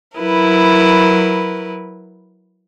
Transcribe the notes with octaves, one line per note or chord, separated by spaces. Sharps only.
F#3 E4 A#4 B4